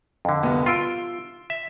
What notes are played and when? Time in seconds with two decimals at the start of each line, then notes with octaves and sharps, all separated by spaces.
0.25 F2 D3
0.43 C2 B2 B3
0.66 F4 C6 E6 D7
1.50 E5